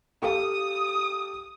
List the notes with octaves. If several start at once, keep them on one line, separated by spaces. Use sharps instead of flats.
G4 A4 F5 D#6